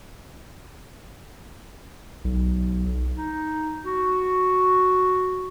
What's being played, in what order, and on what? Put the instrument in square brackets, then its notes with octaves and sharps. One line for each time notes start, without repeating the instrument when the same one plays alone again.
[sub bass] B1
[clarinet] D#4
F#4